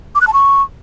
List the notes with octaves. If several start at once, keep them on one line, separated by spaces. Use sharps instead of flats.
D6
F#6
A5
C#6